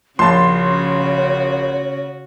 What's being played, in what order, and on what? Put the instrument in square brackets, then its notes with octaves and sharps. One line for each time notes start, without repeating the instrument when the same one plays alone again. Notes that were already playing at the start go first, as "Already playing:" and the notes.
[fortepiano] A#1 A5 [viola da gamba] C#3 C#4 F#4 [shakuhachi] C#5 [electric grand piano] C6